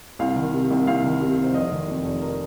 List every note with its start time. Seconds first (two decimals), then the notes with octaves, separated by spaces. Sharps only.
0.19 C2 F5
0.36 D#3
0.53 C3
0.70 C2
0.87 C2 F5
1.04 D#3
1.21 C3
1.38 C2
1.44 C5
1.54 F1 D#5
1.72 D#3
1.88 F2
2.04 F1
2.22 A#4